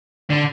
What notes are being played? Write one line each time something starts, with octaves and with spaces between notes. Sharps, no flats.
D3